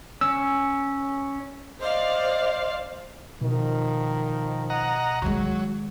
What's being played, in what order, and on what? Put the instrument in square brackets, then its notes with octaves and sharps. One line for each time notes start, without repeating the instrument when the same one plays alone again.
[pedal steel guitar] C#4 [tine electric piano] E6
[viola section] C5 D5 F5 [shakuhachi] D#5
[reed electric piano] B2 [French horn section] D#3 F3
[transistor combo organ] D#5 F#5 A#5
[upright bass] D#3 G#3 [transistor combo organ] F#3